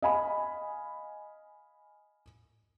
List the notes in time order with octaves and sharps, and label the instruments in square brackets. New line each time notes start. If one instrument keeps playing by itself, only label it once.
[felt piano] D#5 F5 G#5 B5